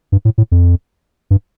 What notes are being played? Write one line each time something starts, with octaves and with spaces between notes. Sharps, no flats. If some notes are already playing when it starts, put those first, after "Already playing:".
G2
A2
A2
F2
G2